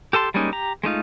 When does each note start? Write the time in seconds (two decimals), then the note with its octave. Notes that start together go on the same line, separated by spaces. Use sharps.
0.13 G4 A4 A5 C6
0.34 G3 G#3 A#3 C#4 D#4
0.52 G4 A#5
0.83 G#3 A3 D#4 F4